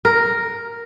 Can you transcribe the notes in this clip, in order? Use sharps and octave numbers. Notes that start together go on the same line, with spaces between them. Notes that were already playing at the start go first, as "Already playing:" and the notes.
A#4